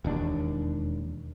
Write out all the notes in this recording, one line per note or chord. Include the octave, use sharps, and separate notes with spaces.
E1 D#2 D4